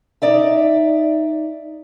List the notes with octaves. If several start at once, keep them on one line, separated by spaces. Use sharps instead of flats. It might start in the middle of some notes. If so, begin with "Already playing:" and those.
D#4 D5 E5